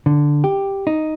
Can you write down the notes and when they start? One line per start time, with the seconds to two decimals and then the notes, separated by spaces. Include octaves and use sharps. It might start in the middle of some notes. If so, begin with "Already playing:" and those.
0.06 D3
0.44 G4
0.87 D#4